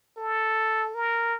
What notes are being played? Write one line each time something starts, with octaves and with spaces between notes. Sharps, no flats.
A4
A#4